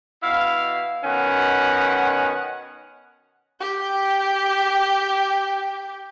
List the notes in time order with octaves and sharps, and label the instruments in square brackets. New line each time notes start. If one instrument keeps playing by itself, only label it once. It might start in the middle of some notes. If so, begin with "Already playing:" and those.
[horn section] B2 E4 F5
B2 D#3 C#4 F#5
[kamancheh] G4 G5